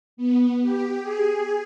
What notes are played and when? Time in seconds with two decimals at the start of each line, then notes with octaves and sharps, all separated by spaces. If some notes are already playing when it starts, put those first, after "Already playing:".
0.17 B3
0.62 G4
1.02 G#4